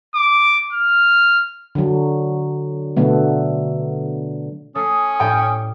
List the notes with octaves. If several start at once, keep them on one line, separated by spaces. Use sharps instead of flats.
D6
F6
D3 F#3
B2 D3 F#3 A3 B3
A3 C#4 D#6 C7
A2 G3 G5 D6 D#6